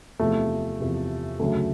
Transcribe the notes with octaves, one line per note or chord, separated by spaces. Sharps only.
E2 C3 F3 A3
E2 C3 F3
D2 C#3 F#3 A3